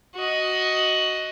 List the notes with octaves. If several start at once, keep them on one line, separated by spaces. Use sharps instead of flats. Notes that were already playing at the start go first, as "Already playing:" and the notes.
F#4 D#5